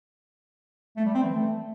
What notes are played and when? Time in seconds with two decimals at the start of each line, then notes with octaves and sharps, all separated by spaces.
0.97 A3
1.06 G3
1.14 C4
1.23 E3
1.32 A3